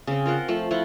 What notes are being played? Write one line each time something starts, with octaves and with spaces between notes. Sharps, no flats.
C#3 C4
F4 A#4 C5 F#5
F3 A3
F3 E4 F4 F#5